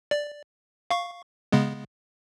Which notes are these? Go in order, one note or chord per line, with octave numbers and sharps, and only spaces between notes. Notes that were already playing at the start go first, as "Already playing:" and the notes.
D5
F5 C#6
C#3 G#3 B3